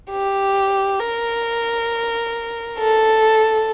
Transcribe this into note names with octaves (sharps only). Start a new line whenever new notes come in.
G4
A#4
A4